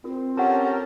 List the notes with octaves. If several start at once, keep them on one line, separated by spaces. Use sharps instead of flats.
C4 F4 A#4
C#4 G4 A4 A#4 F#5 A#5